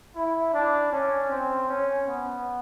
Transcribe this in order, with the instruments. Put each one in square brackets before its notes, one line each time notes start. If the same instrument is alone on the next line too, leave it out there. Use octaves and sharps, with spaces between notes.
[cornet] E4
D4
C#4
C4
C#4
B3